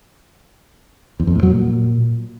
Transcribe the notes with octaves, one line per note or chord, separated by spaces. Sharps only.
E2
F2
A2
F#3
A#2